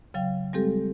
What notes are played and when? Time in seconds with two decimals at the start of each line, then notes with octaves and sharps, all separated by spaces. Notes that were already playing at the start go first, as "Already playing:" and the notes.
0.14 C#3 F#3 F5 G5
0.53 G3 G#3 C4 G4 A4